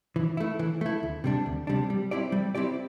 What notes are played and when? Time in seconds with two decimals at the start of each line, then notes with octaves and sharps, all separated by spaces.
0.16 E3
0.37 A3 E4
0.59 E3
0.81 A3 E4
1.03 D2
1.24 C3 G3 D4
1.46 D2
1.67 C3 G3 D4
1.90 G3
2.11 C4 E4 G4 D5
2.32 G3
2.55 C4 E4 G4 D5